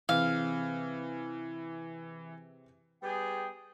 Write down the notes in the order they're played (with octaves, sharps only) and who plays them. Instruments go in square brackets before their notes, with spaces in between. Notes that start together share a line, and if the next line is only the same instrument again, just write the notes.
[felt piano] C3 C4 G#4 [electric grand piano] E3 [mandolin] F5
[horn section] G3 B3 G#4 [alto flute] G5